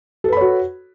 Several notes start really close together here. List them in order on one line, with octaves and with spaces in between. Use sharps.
A4 B4 B5 C#5 F#4